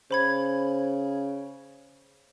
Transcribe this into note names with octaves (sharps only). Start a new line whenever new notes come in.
C#3 C5 B5 G#6